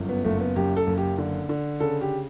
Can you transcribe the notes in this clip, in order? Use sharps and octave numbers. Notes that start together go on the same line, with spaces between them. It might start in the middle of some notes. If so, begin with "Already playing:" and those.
Already playing: G1 F#2
B3
F#1 A3
B3
F#2 G4
A4
F#1
G4
D3
D3
C#3 A4
G4